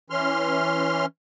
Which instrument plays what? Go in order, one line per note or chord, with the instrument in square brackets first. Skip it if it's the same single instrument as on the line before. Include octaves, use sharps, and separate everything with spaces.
[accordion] E3 C#4 C6 F6